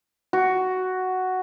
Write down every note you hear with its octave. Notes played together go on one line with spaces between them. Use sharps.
F#4